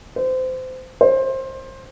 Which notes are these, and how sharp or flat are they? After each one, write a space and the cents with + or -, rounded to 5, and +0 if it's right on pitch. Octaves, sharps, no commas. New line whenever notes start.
C5 -25
C5 +20